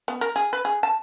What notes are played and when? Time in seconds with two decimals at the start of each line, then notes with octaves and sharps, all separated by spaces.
0.08 B3
0.21 A#4
0.36 G#4
0.53 B4
0.65 G#4
0.83 A5